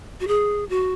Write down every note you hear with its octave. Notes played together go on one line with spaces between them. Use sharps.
F#4
G#4
F#4